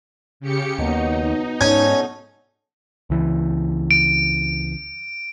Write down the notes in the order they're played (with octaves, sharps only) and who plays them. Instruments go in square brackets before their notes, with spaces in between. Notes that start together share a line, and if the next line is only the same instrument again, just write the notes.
[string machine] C#3 G4 C#7
[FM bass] D#2 [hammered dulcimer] B2 F#3 [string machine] D#4
[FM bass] G#2 [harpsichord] C#4 G#5 [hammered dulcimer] A4 D5
[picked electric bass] C#2 E3
[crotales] D7